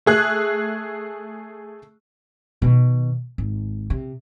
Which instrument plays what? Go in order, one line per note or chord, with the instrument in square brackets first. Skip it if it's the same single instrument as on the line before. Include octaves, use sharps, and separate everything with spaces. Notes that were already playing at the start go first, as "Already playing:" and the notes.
[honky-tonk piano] A3 G#4 F#6
[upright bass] B2 D#3
G#1
C3